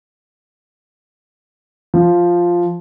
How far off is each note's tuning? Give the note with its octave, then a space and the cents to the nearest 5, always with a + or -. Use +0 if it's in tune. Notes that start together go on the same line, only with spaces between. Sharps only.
F3 +0